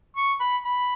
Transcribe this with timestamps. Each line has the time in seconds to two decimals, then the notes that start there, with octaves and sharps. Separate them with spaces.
0.17 C#6
0.40 B5
0.65 B5